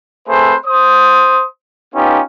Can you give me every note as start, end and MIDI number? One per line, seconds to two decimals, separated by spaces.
0.28 0.54 57
0.28 0.54 60
0.28 0.54 68
0.28 0.54 71
0.28 0.54 72
0.65 1.43 72
0.65 1.43 87
1.94 2.19 59
1.94 2.19 61
1.94 2.19 63
1.94 2.19 65
1.94 2.19 67